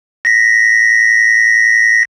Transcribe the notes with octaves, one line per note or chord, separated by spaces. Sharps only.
A#6 B6